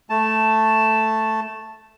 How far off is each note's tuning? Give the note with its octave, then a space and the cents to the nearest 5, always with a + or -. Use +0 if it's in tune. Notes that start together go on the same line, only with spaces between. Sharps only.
A3 +0 A5 +0